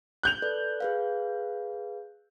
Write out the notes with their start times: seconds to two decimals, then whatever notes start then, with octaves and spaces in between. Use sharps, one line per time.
0.23 F#6 G6 F7
0.42 A4 B4 D5
0.80 G#4 B4 F5